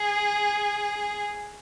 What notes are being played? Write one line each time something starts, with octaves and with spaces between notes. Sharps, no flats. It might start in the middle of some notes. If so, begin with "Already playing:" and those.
Already playing: G#4